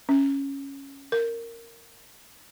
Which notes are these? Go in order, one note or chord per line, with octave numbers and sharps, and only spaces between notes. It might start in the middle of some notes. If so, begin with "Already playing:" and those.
C#4
A#4